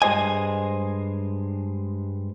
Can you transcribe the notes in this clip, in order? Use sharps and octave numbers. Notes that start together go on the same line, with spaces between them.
G2 G#3 G4 C5 D#5 G#5